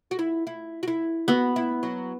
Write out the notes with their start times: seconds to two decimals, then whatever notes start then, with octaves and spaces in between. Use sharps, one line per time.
0.11 F#4
0.19 E4
0.47 E4
0.83 F#4
0.88 E4
1.28 B3 F#4
1.56 E4
1.83 F#3